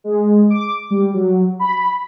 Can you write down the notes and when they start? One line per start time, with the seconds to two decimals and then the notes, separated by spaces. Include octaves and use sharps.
0.04 G#3
0.50 D6
0.91 G3
1.14 F#3
1.59 B5